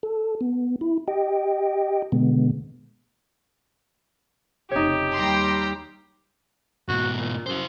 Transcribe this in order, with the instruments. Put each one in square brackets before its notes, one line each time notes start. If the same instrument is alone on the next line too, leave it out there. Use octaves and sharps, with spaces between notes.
[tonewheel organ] A4
B3
E4
G4 D#5 G5
B2 D3 G#3 B3
[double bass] F1 C#3 [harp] D#4 C#5 [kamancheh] G4
[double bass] D#2 G3 [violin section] G5 A#5 C6
[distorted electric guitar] G#2 B2 [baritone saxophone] F#4
[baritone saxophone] A#2
[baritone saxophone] F#2 [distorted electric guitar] E4 C5